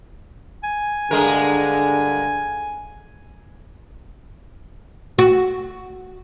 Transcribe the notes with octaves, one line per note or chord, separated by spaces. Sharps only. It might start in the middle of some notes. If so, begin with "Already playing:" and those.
G#5
G2 D3 G#3 A#4
F#4